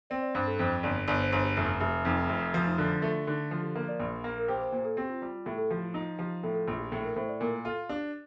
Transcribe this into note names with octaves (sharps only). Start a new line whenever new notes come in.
C4 D5
D5
G2 C5
A4
F2 C5
G1 D5
G1 D5
C5
G1 C5
G4
F1 F4
F1 G4
F2 D#4
F1 F4
F3 F4
D#4
D3 F4
F4
A3 F4
D3 D#4
F3 F4
G4
A#3 A#4
D5
A#1
A#3
A#4
G4 C5
C5
A#2 C5
A4
C4 G4
F4
G3 F4
F4
A2 G4
A4
F3 G4
F4
D#4 F4
F3 G4
A2 A4
A4
A#1 F4
G4
A2 A4
A#4
A2 C5
D5
A#2 A#4
F4 A4
D4 G4